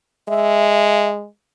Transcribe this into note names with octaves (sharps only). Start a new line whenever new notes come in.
G#3 E5